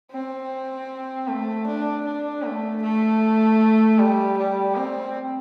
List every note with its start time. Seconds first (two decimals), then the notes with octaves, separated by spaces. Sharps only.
0.11 C4
1.28 A3
1.66 D4
2.05 D4
2.43 A3
2.82 A3
3.99 G3
4.38 G3
4.76 C4